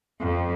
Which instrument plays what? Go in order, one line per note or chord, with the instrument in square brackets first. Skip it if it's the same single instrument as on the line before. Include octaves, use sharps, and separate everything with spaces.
[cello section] F2